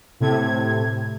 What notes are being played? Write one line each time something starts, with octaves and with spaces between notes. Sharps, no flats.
A2 C3 A3 G#6